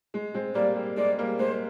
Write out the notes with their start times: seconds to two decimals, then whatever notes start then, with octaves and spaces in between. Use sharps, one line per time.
0.14 G#3
0.34 G#3 C4
0.55 G3 A#3 D5
0.76 G3
0.97 G#3 D5
1.18 G3 A#3
1.39 G#3 C5